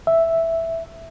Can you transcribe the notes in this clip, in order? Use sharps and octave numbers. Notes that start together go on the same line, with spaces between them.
E5